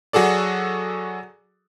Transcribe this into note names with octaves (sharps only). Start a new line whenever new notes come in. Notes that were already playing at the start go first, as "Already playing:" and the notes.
F#3 F#4 G#4 A4 D5